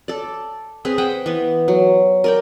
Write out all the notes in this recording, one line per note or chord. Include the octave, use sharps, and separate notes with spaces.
A4 D5
C4 G#4 B4
B4 C5 F#5 G5
E3 B3
F#3
A#4 D5 G5